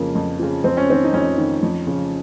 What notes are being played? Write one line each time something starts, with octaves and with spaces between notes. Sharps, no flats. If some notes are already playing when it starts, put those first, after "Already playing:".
Already playing: F2 C#3 F3 A#3
F2
C#3 F3
F2 C4
C#4
D#3 C4
D#4
F2 C#4
D#3
F2
C#3 F3